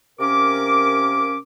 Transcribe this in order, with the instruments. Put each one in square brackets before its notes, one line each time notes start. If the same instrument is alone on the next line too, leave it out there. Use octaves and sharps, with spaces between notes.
[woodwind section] C3 A#3 C#4 A#4 D6